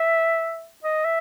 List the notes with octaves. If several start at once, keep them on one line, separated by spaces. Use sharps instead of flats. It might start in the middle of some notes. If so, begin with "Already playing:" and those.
Already playing: E5
D#5
E5